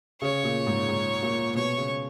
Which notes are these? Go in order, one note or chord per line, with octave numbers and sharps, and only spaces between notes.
C#3 C#5
A#2
G#2
G#2
A#2
B2 C#5
C#3